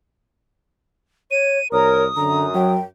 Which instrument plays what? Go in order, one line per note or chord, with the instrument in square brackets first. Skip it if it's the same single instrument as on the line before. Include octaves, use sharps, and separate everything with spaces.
[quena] C#5 [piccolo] D#7
[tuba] C2 [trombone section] A#4 [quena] C#5 [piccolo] D#6
[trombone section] F#2 [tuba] D3 [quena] A#5
[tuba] F#3 [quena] G5